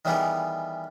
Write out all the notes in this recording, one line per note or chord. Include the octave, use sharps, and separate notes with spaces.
D#3 E3 G3 B3 G4 G#4